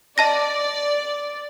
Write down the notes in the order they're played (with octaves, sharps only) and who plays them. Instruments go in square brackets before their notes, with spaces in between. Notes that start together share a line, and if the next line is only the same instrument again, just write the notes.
[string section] D5 [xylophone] D#5 A5 A#6